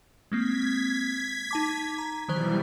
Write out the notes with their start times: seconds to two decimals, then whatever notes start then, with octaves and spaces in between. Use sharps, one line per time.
0.32 G#3 A#3 C4 G#6 B6
1.51 D#4 A5 D6
1.98 A#5
2.29 B2 D#3 E3 F#3 G3 C5